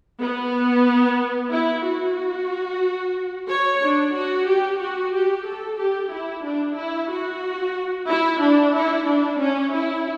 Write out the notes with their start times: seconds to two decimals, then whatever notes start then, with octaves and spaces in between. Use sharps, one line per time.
0.20 B3
1.51 E4
1.85 F#4
3.49 C#5
3.82 D4
4.14 F#4
4.48 G4
4.80 F#4
5.13 G4
5.47 A4
5.79 G4
6.12 E4
6.44 D4
6.77 E4
7.10 F#4
8.09 E4
8.42 D4
8.75 E4
9.08 D4
9.40 C#4
9.74 E4